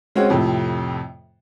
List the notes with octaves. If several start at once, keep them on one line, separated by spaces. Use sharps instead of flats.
G#3 C4 C#4 F#4
F2 A2 C3